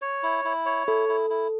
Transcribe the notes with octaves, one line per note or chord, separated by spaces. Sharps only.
C#5
E4
E4
C#5
E4 A4
E4
E4